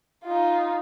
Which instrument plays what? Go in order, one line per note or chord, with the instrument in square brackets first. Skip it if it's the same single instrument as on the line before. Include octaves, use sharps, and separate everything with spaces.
[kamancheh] D#4 F4